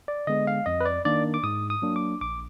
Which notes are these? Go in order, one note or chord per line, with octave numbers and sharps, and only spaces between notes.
D5
D3 G#3 B3 D#5
F5
F2 D#5
B4
D5
D#3 A#3 D4 D5
D6
G#2 D#6
D#6
F#3 A#3 D4
D6
A#1 D6